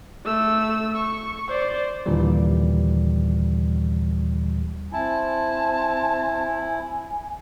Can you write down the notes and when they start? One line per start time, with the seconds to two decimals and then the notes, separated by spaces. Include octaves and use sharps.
0.25 A3 E6
0.96 C#6
1.48 C5 D5
2.06 D#2 A#2 D3 E3 G3
4.92 C4 E4 G#5 A5